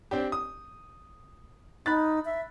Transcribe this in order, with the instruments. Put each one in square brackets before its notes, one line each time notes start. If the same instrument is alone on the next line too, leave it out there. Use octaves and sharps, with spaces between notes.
[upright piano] C4 D4 G4
D#6
[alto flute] D#4 [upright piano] B5 F#6 A6
[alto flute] E5